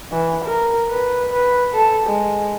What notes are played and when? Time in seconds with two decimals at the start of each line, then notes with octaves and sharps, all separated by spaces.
0.12 E3
0.44 A#4
0.89 B4
1.33 B4
1.74 A4
2.06 G#3